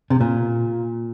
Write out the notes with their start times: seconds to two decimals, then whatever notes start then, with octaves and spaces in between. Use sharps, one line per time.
0.10 C3
0.21 A#2